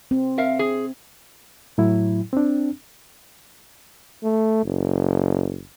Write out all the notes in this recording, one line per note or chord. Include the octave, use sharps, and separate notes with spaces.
C4
A#4 E5 F5
G#4
A2 F#3 E4
C4 D4
A3
F#1